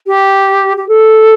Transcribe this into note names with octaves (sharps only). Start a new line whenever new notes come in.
G4
G4
A4